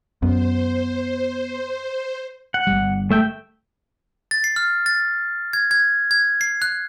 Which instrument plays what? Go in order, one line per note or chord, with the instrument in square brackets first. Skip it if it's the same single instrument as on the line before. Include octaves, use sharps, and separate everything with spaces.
[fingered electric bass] F#2 [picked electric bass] B3 [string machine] C5
[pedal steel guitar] F#5
[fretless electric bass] G1 G3
[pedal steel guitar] A3 E5 G5
[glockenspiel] A6
C7
F6
A6
G#6
G#6
G#6
C7
F#6